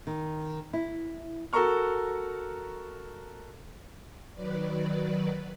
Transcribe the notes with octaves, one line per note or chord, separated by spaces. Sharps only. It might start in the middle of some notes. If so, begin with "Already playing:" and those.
D#3
E4
F#4 A4 A#4 A#5 C#6 F6
D#3 F#3 B4 D5